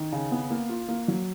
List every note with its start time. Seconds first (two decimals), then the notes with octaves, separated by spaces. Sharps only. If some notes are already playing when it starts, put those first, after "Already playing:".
Already playing: D#3
0.12 C#3
0.32 B3
0.50 A#3
0.69 F4
0.88 A#3
1.08 F#3